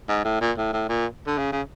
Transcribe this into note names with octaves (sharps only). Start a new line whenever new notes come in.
G#2
A2
A#2
A2
A2
A#2
D3
C#3
C#3